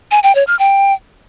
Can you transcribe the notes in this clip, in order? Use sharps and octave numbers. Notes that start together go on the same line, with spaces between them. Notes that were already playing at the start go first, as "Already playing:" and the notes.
G#5
G5
C#5
F6
G5